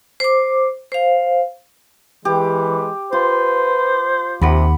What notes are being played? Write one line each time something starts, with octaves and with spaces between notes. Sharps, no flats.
C5 D6
C5 F5
E3 G#3 G4
F4 B4 C5
D#2 C3 F#5 B5